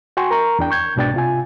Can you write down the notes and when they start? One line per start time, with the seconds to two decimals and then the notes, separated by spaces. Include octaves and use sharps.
0.17 F#4 G5 G#5 C6 C#6
0.31 A#4 A#5 C#6
0.59 E2 D4 G5
0.71 C#6 G6 G#6
0.96 C2 G#2 B2 D4 G5 A6
1.14 C3 F4 G#5